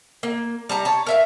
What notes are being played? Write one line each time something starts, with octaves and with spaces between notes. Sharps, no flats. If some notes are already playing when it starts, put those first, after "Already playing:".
A#3
G3 A5 A#5
C#5 A5
A#4 E5 F5